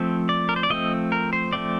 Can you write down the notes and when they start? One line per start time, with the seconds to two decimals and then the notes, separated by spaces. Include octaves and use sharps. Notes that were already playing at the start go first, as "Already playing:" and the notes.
Already playing: F3 A3 C4
0.29 D5
0.49 A#4
0.56 C5
0.63 D5
0.70 F3 A3 C4 D#5
1.12 A#4
1.33 C5
1.53 F3 A3 C4 D5